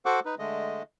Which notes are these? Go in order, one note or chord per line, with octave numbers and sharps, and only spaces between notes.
F#4 A4 C5 F#5 C#6 D6
D#4 B4
D3 G#3 A3 D#5